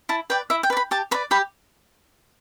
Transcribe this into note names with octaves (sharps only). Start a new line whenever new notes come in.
E4 A5
B4 D5 G5
E4 E5
G5
B4 D5
B5
G4 A5
B4 D5 B5
G4 B5